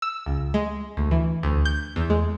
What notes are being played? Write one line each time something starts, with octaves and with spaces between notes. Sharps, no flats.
E6
C#2
G#3
D2
E3
D2
G6
E2
G#3